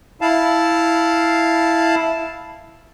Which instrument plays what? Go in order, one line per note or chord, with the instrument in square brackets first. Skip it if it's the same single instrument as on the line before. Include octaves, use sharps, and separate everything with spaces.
[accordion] E4 F5 A5